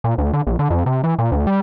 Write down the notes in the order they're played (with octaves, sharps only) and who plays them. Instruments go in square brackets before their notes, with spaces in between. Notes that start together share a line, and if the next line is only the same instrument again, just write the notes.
[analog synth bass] A#2
D2
D3
A#1
D3
F2
C3
E3
A#2
D2
G3